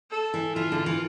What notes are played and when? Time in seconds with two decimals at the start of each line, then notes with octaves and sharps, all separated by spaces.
0.11 A4
0.34 E3
0.56 E3 F4
0.72 D3
0.86 E3